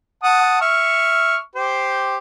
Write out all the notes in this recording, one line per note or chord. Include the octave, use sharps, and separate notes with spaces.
F#5 A5 D#6
E5 C#6 F6
G4 C5